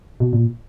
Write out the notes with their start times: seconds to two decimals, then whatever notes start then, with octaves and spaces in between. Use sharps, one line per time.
0.20 B2
0.33 A#2